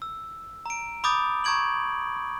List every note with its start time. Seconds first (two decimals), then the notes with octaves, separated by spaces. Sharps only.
0.02 E6
0.66 A#5 D7
1.04 B5 D6 D#6 G6 A6
1.44 A#5 C#6 G6 G#6 D7 F#7